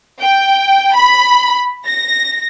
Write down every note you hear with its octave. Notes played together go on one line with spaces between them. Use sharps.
G5
B5
A#6